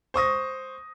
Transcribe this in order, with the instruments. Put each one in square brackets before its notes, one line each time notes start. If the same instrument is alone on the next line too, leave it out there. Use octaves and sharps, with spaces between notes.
[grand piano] C5 C#6 D#6 A#6